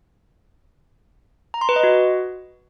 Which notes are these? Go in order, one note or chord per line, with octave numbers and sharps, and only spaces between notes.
A#5
C6
B4
D#5
F#4